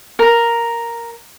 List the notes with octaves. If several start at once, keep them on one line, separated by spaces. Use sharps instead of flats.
A#4